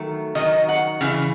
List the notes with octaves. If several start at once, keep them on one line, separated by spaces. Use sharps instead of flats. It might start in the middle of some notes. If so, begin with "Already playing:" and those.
Already playing: D#3 F#3 A3
D#3 F#3 D#5
F#5
C#3 E3